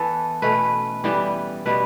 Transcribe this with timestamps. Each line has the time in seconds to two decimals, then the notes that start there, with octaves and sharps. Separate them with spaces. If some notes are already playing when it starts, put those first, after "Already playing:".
Already playing: E3 B3 A4
0.42 B2 A3 C#4 B4
1.04 E3 G3 B3 G4
1.66 B2 G3 B3 B4